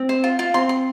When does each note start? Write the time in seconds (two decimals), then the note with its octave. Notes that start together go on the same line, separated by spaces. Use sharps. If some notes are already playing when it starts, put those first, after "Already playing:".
Already playing: C4
0.09 C5
0.24 F4
0.39 F4
0.54 C4 C6
0.69 C6